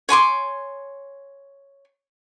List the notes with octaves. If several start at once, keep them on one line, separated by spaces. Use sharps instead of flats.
C#5 G#5 C6 D6